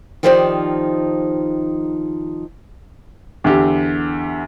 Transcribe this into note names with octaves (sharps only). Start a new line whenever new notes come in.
D#3 F3 D#4 G4 C5 D5
E2 D3 G4